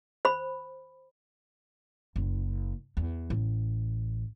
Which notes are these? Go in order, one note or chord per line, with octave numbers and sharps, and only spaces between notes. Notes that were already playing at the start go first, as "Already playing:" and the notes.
C5 B5
F#1
E2
A1